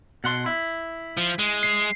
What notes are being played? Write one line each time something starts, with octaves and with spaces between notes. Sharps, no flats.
B2 F#5 C6
E4
F3
G#3
C7